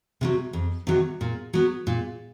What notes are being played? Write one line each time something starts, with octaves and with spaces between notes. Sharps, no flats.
C3 D#3 F#3
F2
C3 D#3 F#3
A#2
F#3 B3
A#2